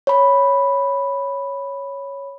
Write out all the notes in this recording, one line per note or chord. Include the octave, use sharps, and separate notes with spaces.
C#5 B5